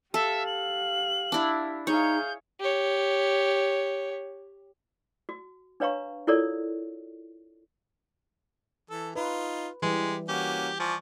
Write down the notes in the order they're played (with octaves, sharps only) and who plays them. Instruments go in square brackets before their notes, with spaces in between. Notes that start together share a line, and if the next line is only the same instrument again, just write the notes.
[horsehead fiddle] G4 F5 [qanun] A4 [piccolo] E5
[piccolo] F#7
[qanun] D4 E4
[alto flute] D#4 [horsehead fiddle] G#4 F5 [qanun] C#5 [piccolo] G6
[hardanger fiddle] G4 C#5
[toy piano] F#4
D4 B4 C#5 F5 A#5 C#6
E4 F4 A4 A#4 C#5 D5
[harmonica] E3 A4
[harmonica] D#4 F4 [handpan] B4
[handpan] E3 G3 [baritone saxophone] G#3 [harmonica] G4
[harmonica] A#3 C#4 F#4 [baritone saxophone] G4
[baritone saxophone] F3 [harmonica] D5 G#5 C#6